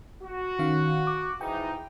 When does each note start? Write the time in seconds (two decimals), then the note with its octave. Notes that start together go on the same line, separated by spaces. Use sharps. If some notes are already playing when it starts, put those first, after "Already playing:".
0.23 F#4
0.59 D#3 C#4 F5
1.07 D6
1.41 G#2 E3 D#4 G5